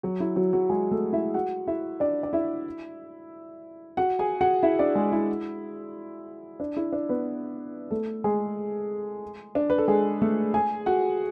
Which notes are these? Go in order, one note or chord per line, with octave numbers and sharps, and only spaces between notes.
F#3 F#4
E4
F#3 F#4
F#3 F#4
G#3 G#4
A3 A4
E4 E5
F#4 F#5
E4 E5
D4 D5
D5
E4 E5
F#4 F#5
G#4 G#5
F#4 F#5
E4 E5
D4 D5
G#3 G#4
E4
D4
E4
D4
B3 B4
A3 A4
G#3 G#4
D4
B4
A4
G#3 G#4
A3 A4
G#4 G#5
F#4 F#5